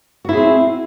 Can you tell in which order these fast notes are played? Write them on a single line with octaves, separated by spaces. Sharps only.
F#4 E4 G#4 C4